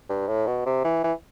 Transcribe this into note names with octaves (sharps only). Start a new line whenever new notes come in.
G2
A2
B2
C3
E3
E3